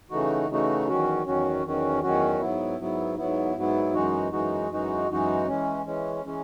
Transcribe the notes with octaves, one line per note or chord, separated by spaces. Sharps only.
C#3 E3 A3 D#4 F#4
C#3 E3 A3 D#4 F#4
E2 D#3 F#3 C#4 F#4
E2 D#3 F#3 C#4 F#4
E2 D#3 F#3 C#4 F#4
E2 D#3 F#3 C#4 F#4
G#2 F#3 B3 E4
G#2 F#3 B3 E4
G#2 F#3 B3 E4
G#2 F#3 B3 E4
F#2 E3 G#3 D#4 F#4
F#2 E3 G#3 D#4 F#4
F#2 E3 G#3 D#4 F#4
F#2 E3 G#3 D#4 F#4
E3 G#3 C#4
E3 G#3 C#4
E3 G#3 C#4